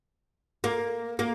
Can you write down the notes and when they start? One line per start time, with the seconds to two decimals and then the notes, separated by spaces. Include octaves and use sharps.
0.64 A#3
1.19 A#3